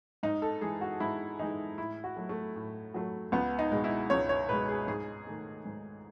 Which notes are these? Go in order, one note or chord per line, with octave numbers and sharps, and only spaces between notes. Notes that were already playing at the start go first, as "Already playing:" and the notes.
G#2 D#4
A4
E3 G#3 G#4
F#4
G#2 E4
E3 G#3 D#4
A2 E4
F#4
F#3 A3
A3
A2
F#3 A3
C#2 B3
D#4
B2 G#3
E4
C#2 C#5
C#5
B2 G#3 B4
G#4
G#2 G#4
D#3 A3
G#2